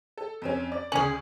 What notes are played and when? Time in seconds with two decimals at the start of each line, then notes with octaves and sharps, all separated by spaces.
0.18 A4
0.42 F2 C4 C#4
0.72 D5
0.92 D2 C#4 G#4 F#7